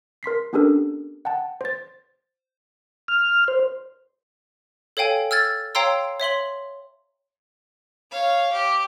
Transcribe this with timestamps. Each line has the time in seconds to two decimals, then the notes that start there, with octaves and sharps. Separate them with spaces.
0.23 A#4 C6 B6 C7
0.53 B3 C#4 D4 G4 A4 A#4
1.25 F#5 G5 A5
1.61 C5 A6
3.08 F6
3.48 C5
4.97 A4 C#5 F5 G5 G#5
5.31 E6 F6 G#6 A6
5.75 C#5 F5 G5 A#5 C6 E6
6.20 C#5 E5 C6 F#7
8.11 C#5 F5
8.53 G4